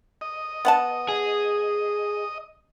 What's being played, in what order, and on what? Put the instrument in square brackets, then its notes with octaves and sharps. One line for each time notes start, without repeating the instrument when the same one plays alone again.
[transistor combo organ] D#5
[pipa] B3 F#5 A5
[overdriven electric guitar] G#4